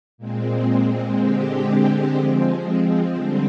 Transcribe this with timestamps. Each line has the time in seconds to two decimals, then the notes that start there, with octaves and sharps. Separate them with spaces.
0.18 A#2 G#3 C4
1.17 D3 G#3 C4 G4
2.15 F3 G#3 C4
3.14 D3 G3 C4